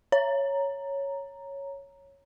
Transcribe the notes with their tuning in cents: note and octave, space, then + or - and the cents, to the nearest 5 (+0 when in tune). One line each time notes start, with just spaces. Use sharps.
C#5 +0 A#5 +0